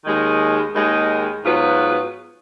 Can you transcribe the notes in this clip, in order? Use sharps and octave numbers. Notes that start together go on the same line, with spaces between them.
D#2 D#3 G#3
D#2 D#3 G#3
G#2 F#3 B3 F4 B4